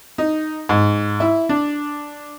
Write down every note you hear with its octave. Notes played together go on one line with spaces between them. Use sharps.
D#4
G#2
E4
D4